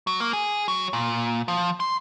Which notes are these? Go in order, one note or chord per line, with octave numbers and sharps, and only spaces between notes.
F#3
A#3
G#4
F#3
A#2
F3
C6